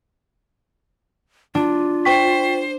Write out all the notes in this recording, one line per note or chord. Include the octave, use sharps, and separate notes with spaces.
D4 F4
C5 G5 C#6 B6